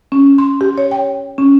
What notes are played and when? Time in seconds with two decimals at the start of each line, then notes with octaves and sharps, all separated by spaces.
0.12 C#4
0.38 C6
0.61 G4
0.78 C#5
0.91 G5
1.38 C#4